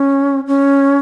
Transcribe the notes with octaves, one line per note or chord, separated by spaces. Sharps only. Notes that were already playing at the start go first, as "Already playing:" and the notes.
Already playing: C#4
C#4